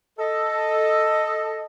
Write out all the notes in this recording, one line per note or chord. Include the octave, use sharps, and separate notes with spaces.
A4 D#5